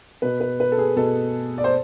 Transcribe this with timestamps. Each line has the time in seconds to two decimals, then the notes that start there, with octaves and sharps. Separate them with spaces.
0.22 B2 B4
0.41 B4
0.60 B4
0.72 A4
0.78 G#4
0.96 B2 A4
1.58 D5
1.64 C5